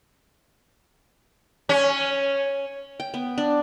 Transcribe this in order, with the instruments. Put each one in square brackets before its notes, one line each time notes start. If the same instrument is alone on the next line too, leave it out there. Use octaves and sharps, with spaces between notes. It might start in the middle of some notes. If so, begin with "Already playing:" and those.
[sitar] C#4
[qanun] G5
B3
D4